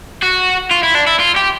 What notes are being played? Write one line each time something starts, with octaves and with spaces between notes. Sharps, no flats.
F#4
F4
E4
D4
E4
F4
G4